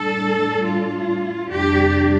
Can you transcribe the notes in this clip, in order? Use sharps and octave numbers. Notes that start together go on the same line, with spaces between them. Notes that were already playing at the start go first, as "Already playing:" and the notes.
Already playing: A2 G3 D4 A4
F4
F2 C3 G3 D4 G4